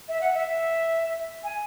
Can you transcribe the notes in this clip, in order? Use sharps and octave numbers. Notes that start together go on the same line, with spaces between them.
E5
F#5
E5
G#5